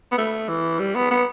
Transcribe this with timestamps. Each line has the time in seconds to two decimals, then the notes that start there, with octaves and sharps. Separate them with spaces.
0.12 B3
0.18 A3
0.48 E3
0.79 G3
0.95 B3
1.11 B3